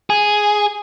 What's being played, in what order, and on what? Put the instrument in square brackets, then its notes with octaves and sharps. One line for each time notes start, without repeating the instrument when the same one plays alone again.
[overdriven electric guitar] G#4